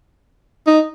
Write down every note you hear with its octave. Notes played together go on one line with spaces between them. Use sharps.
D#4